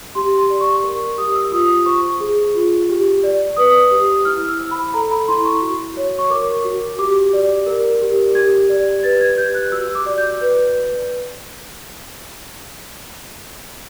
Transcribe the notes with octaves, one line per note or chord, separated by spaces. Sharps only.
G4 C6
C6
D5
C#6
A#4
G4 D#6
E6
F4 D#6
C5 C#6
G#4
F4
G4
D5
B4 D#6
G4
E4 F6
E6
C5
B5
A4 A#5
B5
E4 C6
C#6
F#4
C#5
C#6
A#4 D6
F#4
G4 D6
D5
A#4
G4
G4 G#6
D5
B4 A6
G#6
G4 G6
F#6
F#4 E6
D6
D5
G6
B4